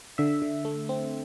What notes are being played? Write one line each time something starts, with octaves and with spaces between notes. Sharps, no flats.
D3 E5
D3
A3
C4